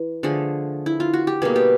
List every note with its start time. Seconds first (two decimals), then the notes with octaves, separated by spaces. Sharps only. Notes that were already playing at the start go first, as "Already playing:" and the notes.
Already playing: E3
0.23 D3 F3 A3 G#4
0.86 E4
1.00 F4
1.14 F#4
1.27 G4
1.42 B2 G3 A#3 G#4
1.56 G4